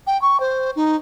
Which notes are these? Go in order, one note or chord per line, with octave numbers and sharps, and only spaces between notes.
G5
C#6
C5
D#4